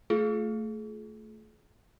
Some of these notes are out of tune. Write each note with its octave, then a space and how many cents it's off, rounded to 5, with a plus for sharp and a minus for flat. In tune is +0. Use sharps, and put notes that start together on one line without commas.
A3 +10 F4 +0 G#4 +35